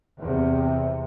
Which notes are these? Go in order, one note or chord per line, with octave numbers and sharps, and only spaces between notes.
E2 C3